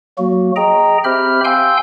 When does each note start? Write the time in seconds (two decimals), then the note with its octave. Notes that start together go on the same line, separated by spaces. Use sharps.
0.18 F#3 A#3 F#4
0.56 G#4 D#5 G5 A#5
1.04 C4 G4 C5 E5 B5 F6
1.45 F5 G5 G#5 C6 E6 G6